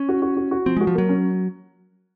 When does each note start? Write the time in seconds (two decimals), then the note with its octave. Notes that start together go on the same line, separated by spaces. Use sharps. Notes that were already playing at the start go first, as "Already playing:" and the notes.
Already playing: C#4
0.09 F#4
0.22 F#4
0.37 F#4
0.51 F#4
0.66 F3 C4
0.77 G#3 F#4
0.87 F3
0.95 F#3 A#3
1.09 C#4